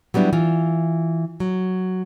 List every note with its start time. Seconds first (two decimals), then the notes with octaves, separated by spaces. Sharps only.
0.14 F#3 G3 B3 D4 E4
0.33 E3 F4
1.40 F#3